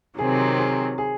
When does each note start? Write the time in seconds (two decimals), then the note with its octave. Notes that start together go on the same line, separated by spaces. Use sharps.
0.18 C3 D#3 F#3 C4 G#4
0.59 G#4
0.98 G#4